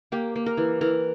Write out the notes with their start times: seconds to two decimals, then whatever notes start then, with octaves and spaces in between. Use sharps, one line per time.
0.12 A#3 G4
0.36 A#3
0.46 A#4
0.57 E3
0.81 E3 A#4